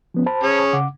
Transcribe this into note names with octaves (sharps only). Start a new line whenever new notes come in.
F3 B3 C#4
C5 A5 B5
C#4 G#4
C#3 F#5 D6